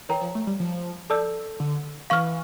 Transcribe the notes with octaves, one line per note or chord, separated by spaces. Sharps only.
E3 A#4 C#5 G5 A#5
F3
A3
G3
F3
A4 D5 A5 E6 G6
D3
E3 F5 C#6 F6